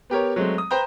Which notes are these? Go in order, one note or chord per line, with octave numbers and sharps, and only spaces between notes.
B3 G4 A#4 C#5
F#3 G#3 A3 C4
D#6
B4 C5 G5 A#5 G6